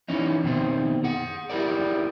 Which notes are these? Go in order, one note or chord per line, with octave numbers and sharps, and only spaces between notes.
E3 C#4 D#4
B2 D#3 C4
G#4 F#5
E4 G4 G#4 A#4 D5